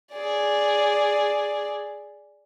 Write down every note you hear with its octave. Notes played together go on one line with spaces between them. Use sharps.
G#4 D5